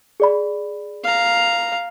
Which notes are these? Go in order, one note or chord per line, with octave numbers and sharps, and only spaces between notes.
G#4 D5 B5
F5 A#5